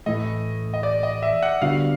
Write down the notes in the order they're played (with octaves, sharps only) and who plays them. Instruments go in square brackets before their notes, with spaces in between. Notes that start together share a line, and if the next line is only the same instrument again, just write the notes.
[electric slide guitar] A2 E3 A3 [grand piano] D#5
[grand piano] D#5
D5
D#5
E5
F#5
[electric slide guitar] D3 G3 B3 D4 F#4 [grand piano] F5